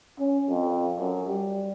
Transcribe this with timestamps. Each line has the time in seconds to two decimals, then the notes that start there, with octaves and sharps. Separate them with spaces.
0.19 C#4
0.49 F2
0.99 F#2
1.27 G3